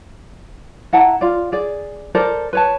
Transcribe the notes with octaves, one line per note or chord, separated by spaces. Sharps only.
E4 F#5 A5 A#5
F4 D5
G#4 D5
A4 A#4 C5 D5
B4 C#5 A5